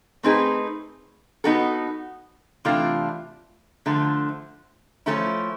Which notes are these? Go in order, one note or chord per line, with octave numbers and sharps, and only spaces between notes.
A3 C4 D#4 G#4 B4
B3 D#4 F#4 A4
C3 E3 A3 D4 F4
D3 F3 A3
F3 A3 C#4 E4